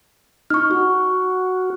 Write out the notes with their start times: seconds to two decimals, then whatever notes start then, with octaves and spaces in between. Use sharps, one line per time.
0.50 D#4 C#6 F6
0.71 F#4